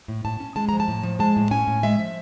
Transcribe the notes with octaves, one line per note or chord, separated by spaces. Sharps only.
A2
A2 A5
C#4
G#3 A5
F3 A#5
A5
A2
F3
G#3 A5
A2
C#4 G#5
A2
G#3 E5
F3